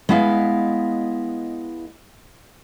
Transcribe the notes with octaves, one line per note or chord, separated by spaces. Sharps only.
G#3 B3 E4 D#5 F5